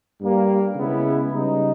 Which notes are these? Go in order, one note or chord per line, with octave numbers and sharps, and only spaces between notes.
G2 G3 A#3
C#3 G#3 B3 E4
C#3 G3 B3 D#4